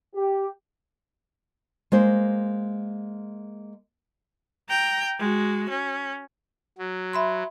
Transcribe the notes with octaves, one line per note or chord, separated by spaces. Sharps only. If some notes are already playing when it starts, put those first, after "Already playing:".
G4
G#3 A#3 C5
G5 A#5
G#3 F#4
C#4
F#3
E5 B5 C6